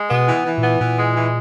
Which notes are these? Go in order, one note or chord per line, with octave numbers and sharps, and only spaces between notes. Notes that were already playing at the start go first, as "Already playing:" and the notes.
Already playing: G#3
B2 B3
E3
E3
A#2
B3
A#2 E3
G#3
E3